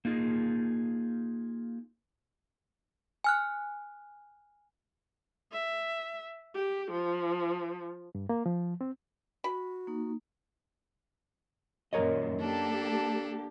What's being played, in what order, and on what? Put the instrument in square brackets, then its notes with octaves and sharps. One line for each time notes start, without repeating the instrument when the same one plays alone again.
[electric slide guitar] A#3 D#4 F4 G#4
[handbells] G#5 F6 F#6
[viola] E5
G4
F3
[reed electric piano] G2
A#3
F3
C4
[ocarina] F#4 [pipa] B5
[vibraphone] A#3 D#4
[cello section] F#2 A#2 D#3 [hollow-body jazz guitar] A#4 C#5 D#5
[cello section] A#3 G4 [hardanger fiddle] D4 A4